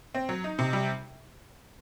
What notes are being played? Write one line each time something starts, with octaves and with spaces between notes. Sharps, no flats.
C4
F#3
D#4
C3
G3